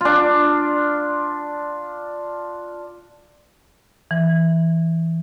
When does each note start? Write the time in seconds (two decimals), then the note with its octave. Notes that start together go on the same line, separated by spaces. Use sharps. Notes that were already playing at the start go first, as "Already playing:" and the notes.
0.01 D4 F4
4.11 E3